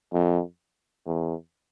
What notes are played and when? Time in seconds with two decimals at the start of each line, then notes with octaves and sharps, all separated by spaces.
0.13 F2
1.06 E2